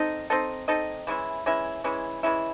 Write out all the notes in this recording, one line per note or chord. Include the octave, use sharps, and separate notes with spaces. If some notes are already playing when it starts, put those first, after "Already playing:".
Already playing: C4 D#4 A4 D#5
C4 D#4 A4 D#5
C4 D#4 A4 D#5
E3 G#3 C#4 E4
E3 G#3 C#4 E4
E3 G#3 C#4 E4
E3 G#3 C#4 E4